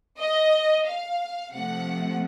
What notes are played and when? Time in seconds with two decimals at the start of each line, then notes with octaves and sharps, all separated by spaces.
0.19 D#5
0.86 F5
1.54 C3 F3 A3 F#5